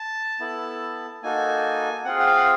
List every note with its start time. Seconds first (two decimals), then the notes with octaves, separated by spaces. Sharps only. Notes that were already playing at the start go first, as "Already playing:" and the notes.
Already playing: A5
0.40 B3 E4 A4
1.23 A#3 D#4 F#4 A4 G#5
2.05 C4 F4 G#4 F#5
2.20 F#5
2.26 F5
2.37 F#5